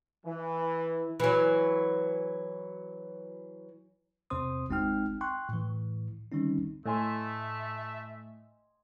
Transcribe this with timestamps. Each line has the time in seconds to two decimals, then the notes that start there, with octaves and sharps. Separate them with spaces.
0.24 E3
1.20 E3 F#3
4.30 E2 C3 C4 C5 C6 D#6
4.69 G#1 G#3 C4 D#4 G5 F6
5.21 G5 C6 C#6 F#6
5.49 A2 E3
6.32 D3 D#3 G3 C4 C#4 D#4
6.86 A2 A3 D#5 E5 G#5 C6